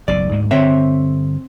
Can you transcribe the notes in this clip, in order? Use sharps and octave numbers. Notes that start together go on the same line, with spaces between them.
F#1 B1 B2 D5
D2 G#2 G#3
G2 D3 C4 C#5 E5